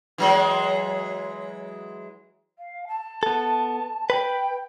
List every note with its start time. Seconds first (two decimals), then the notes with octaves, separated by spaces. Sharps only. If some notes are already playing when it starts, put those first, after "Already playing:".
0.18 E3 F#3 G#3
2.58 F5
2.87 A5
3.23 B3 A4
4.10 B4 G5 B5